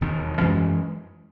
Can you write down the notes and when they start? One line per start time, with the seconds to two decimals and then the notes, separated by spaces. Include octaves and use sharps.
0.01 E1 D#2 D#3
0.39 F#2 E3 G#3 C#4